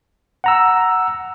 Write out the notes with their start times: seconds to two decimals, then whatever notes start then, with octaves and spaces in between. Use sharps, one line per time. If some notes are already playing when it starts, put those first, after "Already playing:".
0.44 F#5 A#5 E6